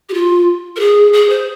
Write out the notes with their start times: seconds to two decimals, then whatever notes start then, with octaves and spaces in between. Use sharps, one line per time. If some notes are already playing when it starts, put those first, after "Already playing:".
0.09 G4
0.14 F4
0.76 A#4
0.80 G#4
1.13 G#4
1.30 C5